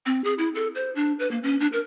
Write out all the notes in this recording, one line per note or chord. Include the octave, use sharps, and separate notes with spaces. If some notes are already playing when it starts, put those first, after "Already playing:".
C4
G#4
E4
A4
C5
D4
B4
A#3
C#4
D4
A#4